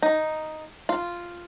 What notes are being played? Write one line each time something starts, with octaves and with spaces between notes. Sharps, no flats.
D#4
F4